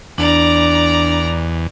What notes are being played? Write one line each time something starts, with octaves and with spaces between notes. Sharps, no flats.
E2 D4 D5 A#5